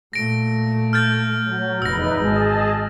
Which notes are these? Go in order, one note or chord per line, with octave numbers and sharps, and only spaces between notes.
A#2 A3 A#6 D7
F6 G6 A6
F#3
F1 E2 D#4 B4 E6 A#6
G#1 G#3 G#4 D#5 A5